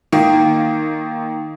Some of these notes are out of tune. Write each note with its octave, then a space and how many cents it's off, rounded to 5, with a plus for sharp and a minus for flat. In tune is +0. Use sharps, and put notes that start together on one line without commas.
D#3 +0 A#3 +0